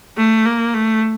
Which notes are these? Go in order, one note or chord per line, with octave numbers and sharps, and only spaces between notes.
A3
A#3
A3